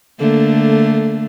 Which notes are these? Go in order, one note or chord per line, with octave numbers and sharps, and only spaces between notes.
D3 A3 A#3